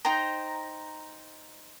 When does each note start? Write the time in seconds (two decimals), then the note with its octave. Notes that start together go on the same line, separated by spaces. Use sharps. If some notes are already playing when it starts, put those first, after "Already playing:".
0.05 D#4 C5 G5 A#5